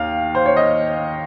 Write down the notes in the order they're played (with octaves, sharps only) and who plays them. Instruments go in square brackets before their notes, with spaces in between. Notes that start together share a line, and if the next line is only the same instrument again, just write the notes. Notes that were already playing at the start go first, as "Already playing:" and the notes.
Already playing: [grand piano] D#2 F5
C5
C#5
D#5